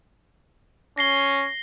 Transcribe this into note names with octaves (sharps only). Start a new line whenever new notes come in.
C#4 A#6 C7 G7